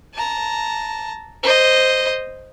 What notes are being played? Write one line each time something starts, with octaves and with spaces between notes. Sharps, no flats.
A5 A#5
C5 D#5